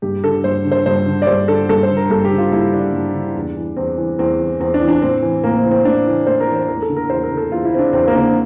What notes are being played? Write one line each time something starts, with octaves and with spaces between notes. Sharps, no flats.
G2 G4
D3 A4
G2 C5
D3
C5
G2 C5
D3
D5
G2 C5
D3 A4
G2 A4
C5
D3
A#4
G2 A4
G4
D3
F4
G2 E4
D3 D4
G2
D3
E2
E3
E2 C4
E3
E2 C4
E3
E2 C4
D4
E3
D4
A2 C4
E3
A2 A#3
C4
E3
C4
A2 D4
E3
A2 C5
A#4
E3
C5
E2 A#4
A4
D3
A#4
E2 C5
A#4
D3
A4
E2 F4
E4
D3 C4
D4
E2 C4
A#3
D3
C4